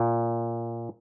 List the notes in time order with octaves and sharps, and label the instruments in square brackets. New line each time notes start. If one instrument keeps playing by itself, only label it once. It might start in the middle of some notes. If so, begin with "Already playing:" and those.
Already playing: [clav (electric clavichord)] A#2